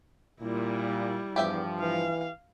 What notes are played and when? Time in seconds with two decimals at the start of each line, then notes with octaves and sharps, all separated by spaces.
0.41 A#2 G3 E4
1.36 E2 G2 F3 G4 E5 G5
1.80 E3 F5